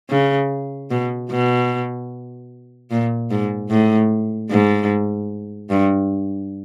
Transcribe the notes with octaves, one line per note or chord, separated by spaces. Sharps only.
C#3
B2
B2
A#2
G#2
A2
G#2
G2